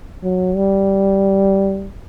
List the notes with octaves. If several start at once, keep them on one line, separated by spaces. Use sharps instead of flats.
F#3
G3